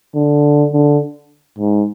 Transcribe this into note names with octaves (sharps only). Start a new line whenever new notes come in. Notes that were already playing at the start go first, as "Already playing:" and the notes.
D3
D3
G#2